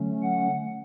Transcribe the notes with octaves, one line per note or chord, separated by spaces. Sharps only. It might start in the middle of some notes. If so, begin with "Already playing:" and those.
Already playing: D3 F#3 A3 C#4
F#5